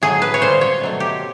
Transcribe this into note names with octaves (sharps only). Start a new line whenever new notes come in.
A2 F#3 A3 G#4
B4
C#5
A#2 G3 C5
C#5
B2 F#3 A3
G4